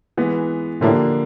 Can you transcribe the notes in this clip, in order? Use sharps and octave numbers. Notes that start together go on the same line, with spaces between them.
E3 G#3 B3
A2 D3 F3 A#3 D4 G4